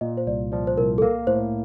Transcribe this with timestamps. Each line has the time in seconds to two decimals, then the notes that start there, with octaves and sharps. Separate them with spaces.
0.01 A#2 D#5
0.17 C5
0.27 C2 D5
0.52 F3 D5
0.67 C5
0.77 C2 A#4
0.98 A4
1.02 A#3 A#4
1.27 A2 C5